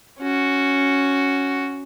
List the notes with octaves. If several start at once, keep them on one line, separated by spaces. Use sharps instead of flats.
C#4 F#4